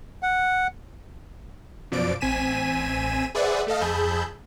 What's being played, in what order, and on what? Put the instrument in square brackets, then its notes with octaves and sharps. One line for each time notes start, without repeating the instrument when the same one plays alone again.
[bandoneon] F#5
[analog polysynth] F#2 B2 F3 D5 D7
A1 C4 G#5 B6 D#7 E7
G#4 B4 C5 D5 E5 F#5
A3 A4 D#5 F5
F2 G#4 A5 B5 E6 G6